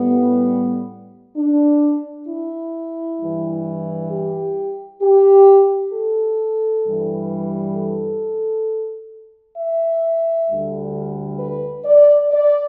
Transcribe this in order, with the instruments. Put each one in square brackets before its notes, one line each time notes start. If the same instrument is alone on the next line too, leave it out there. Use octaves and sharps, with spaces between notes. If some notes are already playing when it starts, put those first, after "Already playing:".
Already playing: [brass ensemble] A2 G3 B3
D4
E4
G2 E3 G3
G4
G4
A4
G2 E3 G3
A4
E5
D2 D3 G3
B4
D5
D5